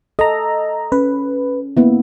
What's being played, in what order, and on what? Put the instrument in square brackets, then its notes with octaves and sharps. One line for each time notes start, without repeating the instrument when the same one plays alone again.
[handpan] A4 [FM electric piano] D#5 A#5
[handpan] C#4 [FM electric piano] B4
[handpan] A#3 B3 E4